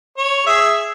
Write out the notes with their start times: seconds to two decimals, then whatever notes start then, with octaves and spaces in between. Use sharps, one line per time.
0.18 C#5
0.47 G#4 E5